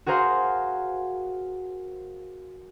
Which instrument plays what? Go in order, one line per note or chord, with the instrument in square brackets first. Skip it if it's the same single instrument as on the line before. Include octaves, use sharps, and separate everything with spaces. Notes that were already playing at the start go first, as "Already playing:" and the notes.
[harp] F#4 G#4 A#4 C5 F5 F#5